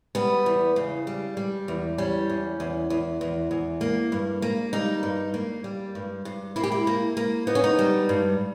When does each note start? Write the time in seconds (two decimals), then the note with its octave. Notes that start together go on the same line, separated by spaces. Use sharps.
0.15 G3 B3
0.46 E2
0.76 C#3
1.07 G3
1.37 G3
1.68 E2
1.98 G3 C#4
2.30 E2
2.60 E2
2.90 E2
3.21 E2
3.51 E2
3.81 A#3
4.12 G2
4.42 A#3
4.73 G3 D#4
5.03 G2
5.34 A#3
5.64 G3
5.95 G2
6.25 G2
6.56 A#3 E4
6.63 G4
6.72 E4
6.87 A#3
7.17 A#3
7.47 B3 D#4
7.55 C#4
7.64 D#4
7.79 G3
8.09 G2